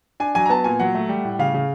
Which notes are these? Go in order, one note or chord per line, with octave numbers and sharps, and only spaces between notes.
D4 G#5
F#3 G#5
A#5
B3 A5
A#2 G#5
F#3 F#5
A3
G3
A2
C#3 F5
C#3